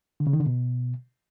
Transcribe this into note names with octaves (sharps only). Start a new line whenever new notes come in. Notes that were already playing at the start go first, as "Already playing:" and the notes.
D3
C#3
D#3
D3
B2